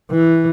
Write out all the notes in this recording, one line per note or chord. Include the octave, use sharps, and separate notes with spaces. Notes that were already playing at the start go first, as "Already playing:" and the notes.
E3